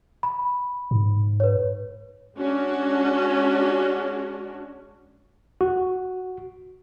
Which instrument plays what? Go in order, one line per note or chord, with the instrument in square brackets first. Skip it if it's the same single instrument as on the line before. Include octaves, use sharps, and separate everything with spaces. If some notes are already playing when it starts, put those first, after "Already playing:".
[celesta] B5
[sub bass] G#2
[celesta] B4 C#5
[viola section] G#3 C#4 D4 F#4
[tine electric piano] F#4